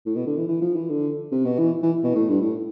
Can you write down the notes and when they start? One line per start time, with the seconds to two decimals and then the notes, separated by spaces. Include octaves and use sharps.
0.06 A2
0.16 B2
0.27 D3
0.37 E3
0.48 E3
0.61 F3
0.76 E3
0.89 D3
1.31 C3
1.45 B2
1.58 E3
1.83 E3
2.03 B2
2.15 A2
2.29 G2
2.41 A2